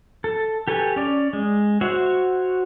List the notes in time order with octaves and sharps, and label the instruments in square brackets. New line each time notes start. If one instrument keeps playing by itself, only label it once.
[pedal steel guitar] A4
G4 A4 B4 C#5 G#5
C#4 D5
G#3
F#4 C5 C#5 E5 F#5